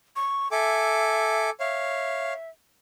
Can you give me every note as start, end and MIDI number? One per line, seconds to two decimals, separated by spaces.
0.16 0.48 85
0.52 1.50 69
0.52 1.51 76
0.52 1.50 80
0.52 1.50 86
1.60 2.33 73
1.60 2.50 76
1.60 2.33 77